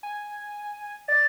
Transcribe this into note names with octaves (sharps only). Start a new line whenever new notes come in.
G#5
D5 A6